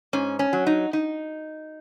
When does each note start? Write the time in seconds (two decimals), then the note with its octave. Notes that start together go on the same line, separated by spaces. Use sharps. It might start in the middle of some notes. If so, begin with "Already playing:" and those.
0.13 G#2 C#4
0.39 C#4
0.53 F#3
0.67 D#4
0.93 D#4